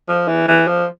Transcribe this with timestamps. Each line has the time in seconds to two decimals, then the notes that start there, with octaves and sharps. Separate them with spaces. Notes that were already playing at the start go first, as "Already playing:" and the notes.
0.09 F3
0.28 E3
0.48 E3
0.67 F3